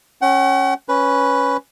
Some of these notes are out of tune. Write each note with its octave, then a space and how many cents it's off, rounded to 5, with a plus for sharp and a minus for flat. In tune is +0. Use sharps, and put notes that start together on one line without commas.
C#4 -15 F#5 +40
C#4 +0 B4 +0